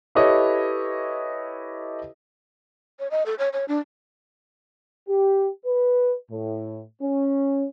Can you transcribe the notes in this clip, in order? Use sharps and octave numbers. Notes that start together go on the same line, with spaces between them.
E4 G4 A4 B4 C#5 D#5
C#5
D#5
A4
C#5
C#5
D4
G4
B4
A2
C#4